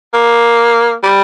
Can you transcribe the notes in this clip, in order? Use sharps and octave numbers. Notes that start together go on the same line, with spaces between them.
A#3
G3